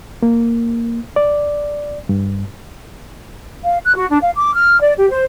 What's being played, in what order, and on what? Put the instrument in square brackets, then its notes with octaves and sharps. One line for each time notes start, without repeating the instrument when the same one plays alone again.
[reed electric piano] A#3
D5
G2
[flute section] F5
F#6
F#4
D4
F5
D6
F6
D5
G4
C5